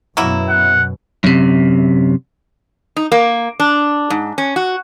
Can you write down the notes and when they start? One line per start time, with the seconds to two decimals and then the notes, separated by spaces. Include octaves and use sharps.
0.17 F#2 B2 F#3 A#3 E4
0.49 F#5
1.24 F#2 C3
2.97 D#4
3.12 A#3
3.60 D4
4.10 G#2
4.38 C#4
4.56 F#4